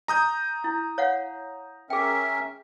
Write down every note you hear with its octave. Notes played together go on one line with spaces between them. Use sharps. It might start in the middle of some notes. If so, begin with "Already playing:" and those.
A#5 D#6 G6
E4
C#5 F5 F#5
C#4 G#4 A#4 E5 G5